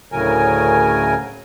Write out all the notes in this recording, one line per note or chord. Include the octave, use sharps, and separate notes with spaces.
D2 A2 C#3 F#3 A#4 G#5